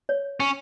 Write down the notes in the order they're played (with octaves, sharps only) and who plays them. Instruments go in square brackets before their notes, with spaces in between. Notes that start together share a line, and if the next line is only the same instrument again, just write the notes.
[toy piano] C#5
[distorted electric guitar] C#4